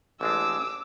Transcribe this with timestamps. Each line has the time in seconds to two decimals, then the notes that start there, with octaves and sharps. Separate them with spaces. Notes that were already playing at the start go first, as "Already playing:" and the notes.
0.21 A1 G#3 D4 D6 E6